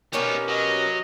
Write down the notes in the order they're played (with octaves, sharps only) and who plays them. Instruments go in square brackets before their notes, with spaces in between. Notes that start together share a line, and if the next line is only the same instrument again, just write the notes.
[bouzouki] B2 C#4 G4 [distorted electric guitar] B3 D#4 [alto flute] A#4
[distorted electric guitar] F#3 [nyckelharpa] D#5